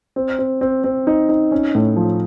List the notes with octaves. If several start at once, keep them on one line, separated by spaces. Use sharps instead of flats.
C4
C4
C4
C4
D#4
D#4
C#4
A2
F3